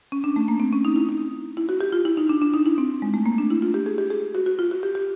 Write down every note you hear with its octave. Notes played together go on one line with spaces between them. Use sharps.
C#4
D4
A3
A#3
C4
C#4
D#4
E4
D#4
E4
F#4
G4
F4
E4
D#4
D4
D4
D#4
E4
C4
G#3
A3
A#3
D4
E4
F4
G4
G#4
G4
G#4
F#4
F#4
F4
F#4
G4
G4